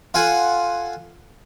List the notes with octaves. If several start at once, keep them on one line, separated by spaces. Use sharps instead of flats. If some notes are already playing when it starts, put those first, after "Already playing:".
F4 A4 F#5 G#5